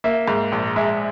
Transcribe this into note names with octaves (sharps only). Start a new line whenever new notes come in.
A#3 E5
G#2
A#1
G#3 E5